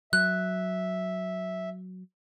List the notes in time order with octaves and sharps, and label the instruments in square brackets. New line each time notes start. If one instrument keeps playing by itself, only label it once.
[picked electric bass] F#3 [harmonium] E5 [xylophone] F#6